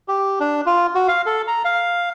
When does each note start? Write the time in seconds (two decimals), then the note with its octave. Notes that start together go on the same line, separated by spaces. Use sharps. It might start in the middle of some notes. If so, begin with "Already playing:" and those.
0.08 G4
0.40 D4
0.66 F4
0.95 F#4
1.08 F5
1.26 A4
1.47 A#5
1.65 F5